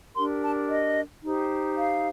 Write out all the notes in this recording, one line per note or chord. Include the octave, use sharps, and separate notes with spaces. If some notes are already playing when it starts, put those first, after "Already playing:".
D4 G4 A#4 C6
A5
D#5
D#4 G4 C5
F5